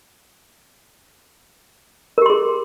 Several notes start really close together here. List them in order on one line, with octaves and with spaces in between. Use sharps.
A#4 G4 C6 G#4